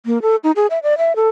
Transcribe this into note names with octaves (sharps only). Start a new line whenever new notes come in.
A#3
A4
D#4
G#4
E5
D5
E5
A4